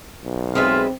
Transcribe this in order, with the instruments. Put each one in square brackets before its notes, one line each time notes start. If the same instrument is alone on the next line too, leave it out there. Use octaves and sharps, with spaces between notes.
[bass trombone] B1
[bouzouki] G#3 B4 E5 [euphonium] C4 [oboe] F4